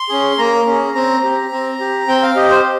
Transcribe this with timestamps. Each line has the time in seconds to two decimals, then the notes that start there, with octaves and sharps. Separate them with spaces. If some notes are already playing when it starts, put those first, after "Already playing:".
Already playing: C6
0.09 C#4 G#4
0.38 A#3 A#5
0.66 C#4 G#4
0.95 C4 A#5
1.23 G4
1.51 C4
1.80 G4
2.08 C4 G5
2.23 F5
2.36 G4 D#5
2.50 C5